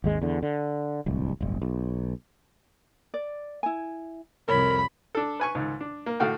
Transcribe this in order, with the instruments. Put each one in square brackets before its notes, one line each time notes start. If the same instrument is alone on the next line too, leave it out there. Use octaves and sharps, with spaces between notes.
[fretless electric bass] G#1 D#2 G#3
E2 D3
D3
D1 C2
D1 G1
B1
[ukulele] D5
E4 G#5
[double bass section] C2 F2 [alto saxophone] A#4 [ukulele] C#5 [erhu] B5
[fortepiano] D4 A4
B4 G#5 C#6
C#2 G#2 D#3
D4
A#3
A2 D3 F#4 F5 G5